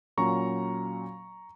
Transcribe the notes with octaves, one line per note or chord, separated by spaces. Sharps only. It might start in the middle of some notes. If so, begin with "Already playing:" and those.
A#2 F#3 C#4 F4 A#5 C#6